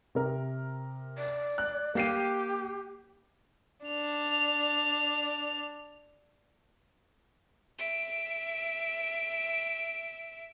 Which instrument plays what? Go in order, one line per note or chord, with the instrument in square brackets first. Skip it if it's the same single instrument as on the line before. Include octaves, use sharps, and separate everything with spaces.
[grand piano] C3 A#4
[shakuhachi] D5
[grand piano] F#6
[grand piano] A#3 C7 D#7 [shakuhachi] G4
[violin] D4 F7
E5 D7